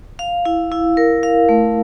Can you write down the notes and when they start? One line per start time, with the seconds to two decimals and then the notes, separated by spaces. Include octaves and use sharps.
0.19 F5
0.45 E4
0.72 E4
0.97 A#4
1.23 F5
1.49 A3